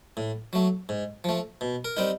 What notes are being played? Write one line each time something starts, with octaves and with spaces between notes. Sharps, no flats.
A2
F#3 A3
G#2
F3 A3
B2
A#4
G3 C4 D#4